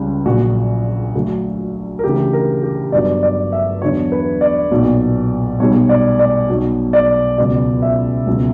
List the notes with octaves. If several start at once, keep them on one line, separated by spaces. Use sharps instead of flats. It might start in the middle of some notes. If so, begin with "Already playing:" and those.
Already playing: C#2 C#3 G3
A#1 A#2 F#3 F#4
D2 D3 F#3
A#4
D2 C#3 E3 G4
A#4
G4
G1 G2 F#3 D5
D5
E5
E2 D3 F#3 C#5
B4
D5
B1 A#2 F#3
B1 B2 G3 C#5
D5
D5
B1 B2 F#3
D5
C#2 B2 F#3 D5
E5
C#2 B2 F#3